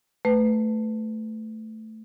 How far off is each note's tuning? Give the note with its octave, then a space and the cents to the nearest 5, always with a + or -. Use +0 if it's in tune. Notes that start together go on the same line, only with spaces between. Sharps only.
A3 +0 B4 +15